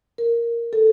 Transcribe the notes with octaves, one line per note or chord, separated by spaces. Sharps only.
A#4
A4